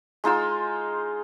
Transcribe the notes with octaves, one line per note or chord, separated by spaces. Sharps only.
G#3 D#4 F4 E6